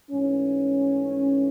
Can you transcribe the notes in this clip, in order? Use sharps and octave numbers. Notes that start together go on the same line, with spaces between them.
G#2 E3 A3 C#4